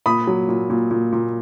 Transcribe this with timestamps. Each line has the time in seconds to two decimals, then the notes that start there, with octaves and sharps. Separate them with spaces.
0.06 A#2 B5 D#6
0.27 F#3
0.49 A#2
0.70 A#2
0.91 A#2
1.12 A#2